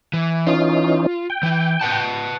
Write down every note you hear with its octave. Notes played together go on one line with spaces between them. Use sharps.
E3
E3 C#4 D#4 F4
G5
E3 E4
B4 F#5 A5